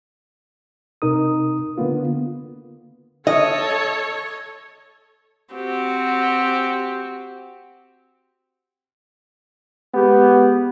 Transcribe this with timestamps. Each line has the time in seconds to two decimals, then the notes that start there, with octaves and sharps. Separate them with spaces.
1.02 C3 D#4 A#4 D#6
1.78 D3 A#3 B3 F4
3.27 A4 C#5 D#5
5.55 C4 F#4 G4
9.94 G#3 B3 G4